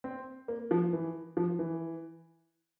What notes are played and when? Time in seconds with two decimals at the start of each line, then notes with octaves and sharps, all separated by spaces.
0.04 C4
0.48 A#3
0.71 F3
0.93 E3
1.37 F3
1.59 E3